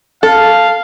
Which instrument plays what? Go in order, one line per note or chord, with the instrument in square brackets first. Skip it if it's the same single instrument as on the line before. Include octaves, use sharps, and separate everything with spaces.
[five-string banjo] A4 [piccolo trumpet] F5